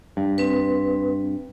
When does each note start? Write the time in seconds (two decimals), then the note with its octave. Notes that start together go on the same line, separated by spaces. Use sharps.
0.17 G2
0.38 C4 B4